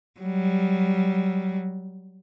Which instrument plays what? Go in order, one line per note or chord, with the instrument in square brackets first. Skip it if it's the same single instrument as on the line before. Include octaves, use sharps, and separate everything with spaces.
[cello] F#3 G3